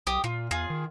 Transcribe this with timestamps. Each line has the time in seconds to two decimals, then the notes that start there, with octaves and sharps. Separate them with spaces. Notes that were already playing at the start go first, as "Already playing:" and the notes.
0.07 B1 G4 D#6
0.24 A#2 F4
0.51 E2 F4 G#4
0.70 D#3